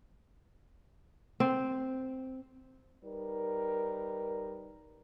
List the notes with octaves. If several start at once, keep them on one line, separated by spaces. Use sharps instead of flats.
C4
G3 D#4 A#4 B4